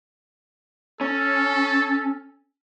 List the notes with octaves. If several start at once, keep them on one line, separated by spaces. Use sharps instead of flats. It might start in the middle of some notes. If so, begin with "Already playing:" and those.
C#4 A4